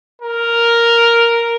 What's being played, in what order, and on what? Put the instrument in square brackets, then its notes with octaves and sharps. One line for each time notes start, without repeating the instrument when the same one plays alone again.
[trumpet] A#4